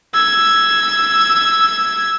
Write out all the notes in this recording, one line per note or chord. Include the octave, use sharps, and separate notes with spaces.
E6 G#6